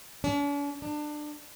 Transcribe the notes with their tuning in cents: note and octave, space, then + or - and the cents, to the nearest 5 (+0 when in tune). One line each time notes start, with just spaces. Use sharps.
D4 -45
D4 +25